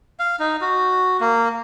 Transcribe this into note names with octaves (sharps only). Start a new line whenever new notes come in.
F5
D#4
F#4
A#3